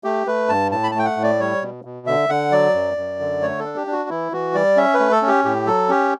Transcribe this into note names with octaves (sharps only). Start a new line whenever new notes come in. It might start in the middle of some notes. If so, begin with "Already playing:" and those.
A3 G4
A3 B4
G2 A5
A2 A5
B5
A5
A3 G5
F#5
A2
D5
G3 C#5
B2
B2
D3 E5
D3 F#5
F#3 D5
F#2
F#2
D3
A3 C#5
A4
D4
G4
D4
F#4
E3 E4
E3 F#4
G3 D5
C#4 E5
B4
A3
A4
C#4
G4
A2 G4
F#3 A4
C#4 G4